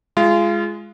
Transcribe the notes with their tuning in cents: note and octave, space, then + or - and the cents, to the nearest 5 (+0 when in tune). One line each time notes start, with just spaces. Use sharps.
G#3 +5 F4 -25